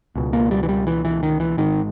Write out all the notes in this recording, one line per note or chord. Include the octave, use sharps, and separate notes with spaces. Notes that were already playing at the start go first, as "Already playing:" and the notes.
C#2 B2
A#3
G3
E3
G3
E3
E3
D#3
E3
G#1 G#2 D#3